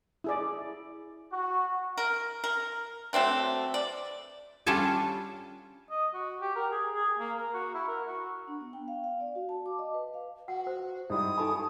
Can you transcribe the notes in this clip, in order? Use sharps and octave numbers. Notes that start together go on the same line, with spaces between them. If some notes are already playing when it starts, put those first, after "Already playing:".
E4 G#4 D5
F#4
A#4
A#4
F#3 A3 C4 D4
D5
G3 C#4 D4 F4 A4 G#5
D#5
F#4
G4
A#4
G#4
G#4
A#3
A#4
F#4
E4
A#4
F#4
D4
B3
G5
F5
F5
D5
F#4
A5
D6
D#5
B4
F5
F#4 F#5
C5
G#2 G3 E4 D#6
D#4 A4 G#5 A5 B5 C#6